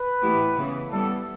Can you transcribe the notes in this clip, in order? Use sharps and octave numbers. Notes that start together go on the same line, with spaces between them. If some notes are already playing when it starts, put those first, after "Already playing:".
Already playing: B4
A2 E3 B3 E4 G4
C#3 E3 B3
E3 G3 B3 A4